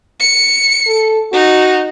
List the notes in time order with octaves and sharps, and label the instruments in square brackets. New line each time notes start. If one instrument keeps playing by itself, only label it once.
[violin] C#7
[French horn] A4
[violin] D#4 [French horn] F#4